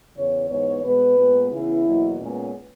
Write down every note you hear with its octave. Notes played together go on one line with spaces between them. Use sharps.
E2 C#3 E3 C#5
G#2 E3 B3 C#5
B2 G#3 B3 B4
A#2 G#3 B3
C#3 E3 B3 E4
E2 B2 F#3 A#3
A#2 G#3 B3 C#4